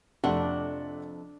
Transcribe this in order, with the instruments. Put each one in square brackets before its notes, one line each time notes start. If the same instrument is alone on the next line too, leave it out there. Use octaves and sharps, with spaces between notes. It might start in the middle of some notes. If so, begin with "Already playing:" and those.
[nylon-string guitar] F2 [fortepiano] C3 A3 F#5 [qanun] D4